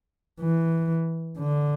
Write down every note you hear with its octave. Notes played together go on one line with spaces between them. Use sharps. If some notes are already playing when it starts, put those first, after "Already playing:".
E3
D3